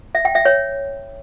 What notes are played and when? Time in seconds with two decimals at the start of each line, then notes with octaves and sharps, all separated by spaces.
0.15 E5
0.25 G5
0.35 E5
0.45 C#5